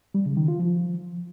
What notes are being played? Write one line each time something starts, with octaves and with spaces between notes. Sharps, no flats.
G3
C#3
D#3
F4
F3